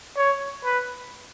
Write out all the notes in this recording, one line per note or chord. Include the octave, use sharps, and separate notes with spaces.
C#5
B4